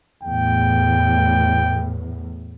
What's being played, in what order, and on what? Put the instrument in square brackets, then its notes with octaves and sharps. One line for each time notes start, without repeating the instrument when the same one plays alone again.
[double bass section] E2 A2 [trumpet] G5